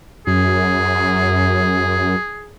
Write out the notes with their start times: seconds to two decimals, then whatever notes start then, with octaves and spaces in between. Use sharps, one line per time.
0.27 F#2 G#4